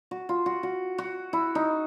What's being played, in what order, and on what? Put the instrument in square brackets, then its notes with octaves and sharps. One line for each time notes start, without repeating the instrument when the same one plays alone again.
[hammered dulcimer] F#4
F4
F#4
F#4
F#4
E4
D#4